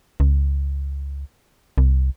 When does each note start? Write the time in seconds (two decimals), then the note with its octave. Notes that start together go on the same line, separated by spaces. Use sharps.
0.20 C#2
1.78 C2